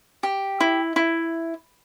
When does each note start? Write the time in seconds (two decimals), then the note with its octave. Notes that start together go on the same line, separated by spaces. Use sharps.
0.23 G4
0.60 E4
0.96 E4